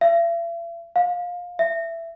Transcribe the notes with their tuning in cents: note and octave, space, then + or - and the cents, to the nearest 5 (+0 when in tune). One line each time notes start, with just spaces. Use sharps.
E5 +45
F5 +20
E5 +15